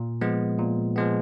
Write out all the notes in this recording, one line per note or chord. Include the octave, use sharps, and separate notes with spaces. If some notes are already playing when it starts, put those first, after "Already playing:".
Already playing: A#2
F3 G#3 B3
A#2
F3 G#3 B3